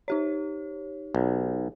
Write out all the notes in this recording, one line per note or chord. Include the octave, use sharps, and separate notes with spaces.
D#4 G4 C#5
B1